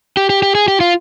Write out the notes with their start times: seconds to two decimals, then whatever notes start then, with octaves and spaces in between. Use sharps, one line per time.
0.17 G4
0.30 G4
0.43 G4
0.55 G#4
0.68 G4
0.81 F4